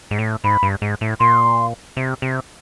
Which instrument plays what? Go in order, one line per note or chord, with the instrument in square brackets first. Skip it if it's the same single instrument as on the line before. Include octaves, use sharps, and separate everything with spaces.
[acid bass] G#2
A2
[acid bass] G#2 [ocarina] B5
[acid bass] G2
G#2
A2
[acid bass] A#2 [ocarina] C6
[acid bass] C3
C3